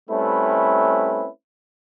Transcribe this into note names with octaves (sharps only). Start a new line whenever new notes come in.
G3 A3 C4 C#4 E4 B4